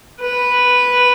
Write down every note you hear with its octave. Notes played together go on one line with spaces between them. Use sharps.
B4